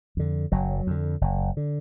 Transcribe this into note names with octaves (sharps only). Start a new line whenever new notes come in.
F2 D3
F#1 F#3
F2 D3
F#1
D3